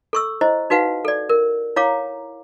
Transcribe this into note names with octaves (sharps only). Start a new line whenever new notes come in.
A4 C#6 E6
E4 C5 D#5
D#4 F#4 B4 F5 F#5
A4 D5
A#4
E4 C#5 F5 A#5 D6